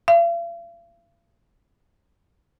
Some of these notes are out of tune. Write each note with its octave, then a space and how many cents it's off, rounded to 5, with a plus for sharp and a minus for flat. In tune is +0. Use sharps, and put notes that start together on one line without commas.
F5 -45